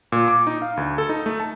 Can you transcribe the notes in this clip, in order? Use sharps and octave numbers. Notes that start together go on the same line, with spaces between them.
A#2
D6
D#4
F5
D2
A4
D#4
A3
A5